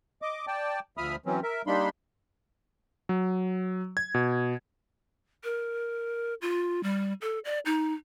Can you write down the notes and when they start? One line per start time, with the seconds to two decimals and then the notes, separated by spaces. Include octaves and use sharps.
0.22 D#5 D6
0.47 D5 G5 A5
0.97 D2 F3 E5 B5 D#6 F6
1.26 E3 F#3 C4 C#4
1.43 A#4 E5
1.67 G3 A#3 D4 D#4 B5 C6
3.09 F#3
3.97 G#6
4.14 B2
5.44 A#4
6.42 F4
6.83 G3
7.22 A4
7.45 D5
7.65 D#4